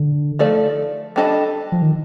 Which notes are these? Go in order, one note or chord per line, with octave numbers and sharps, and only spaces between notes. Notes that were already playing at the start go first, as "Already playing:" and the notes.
Already playing: D3
F3 A3 D#4 A4 D5
G3 D4 A4 D#5
F3
D#3